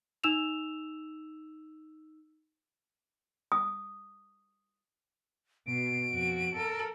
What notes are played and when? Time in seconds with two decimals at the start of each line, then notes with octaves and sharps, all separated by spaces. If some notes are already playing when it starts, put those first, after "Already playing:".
0.24 D#4 E6 E7 F7
3.52 D#6
5.67 B2 D7
6.11 F2 F#4
6.54 A4 A#4